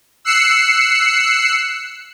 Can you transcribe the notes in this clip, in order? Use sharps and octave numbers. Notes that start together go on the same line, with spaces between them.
E6 F#6 C7 C#7